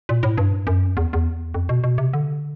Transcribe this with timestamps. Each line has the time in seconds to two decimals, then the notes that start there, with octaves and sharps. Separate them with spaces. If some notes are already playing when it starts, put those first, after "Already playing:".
0.09 A#2
0.23 A2
0.37 G2
0.67 F#2
0.97 E2
1.13 E2
1.54 F2
1.69 B2
1.84 B2
1.98 C3
2.13 D3